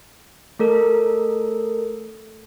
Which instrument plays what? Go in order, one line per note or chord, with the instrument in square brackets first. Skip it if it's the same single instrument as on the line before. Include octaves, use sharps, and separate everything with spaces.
[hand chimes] A3 A4 A#4